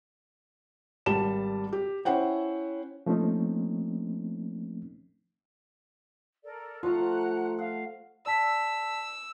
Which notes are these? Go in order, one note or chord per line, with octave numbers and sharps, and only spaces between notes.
G#1 G3 A5 E7
G4
C#4 E4 C5 C#5 F#5 G5
F3 A3 A#3 C4 C#4 D#4
A4 A#4 D5
F3 A3 F4 F#5 A#5 F#6
F5 F#5
D5 A5 E6 B6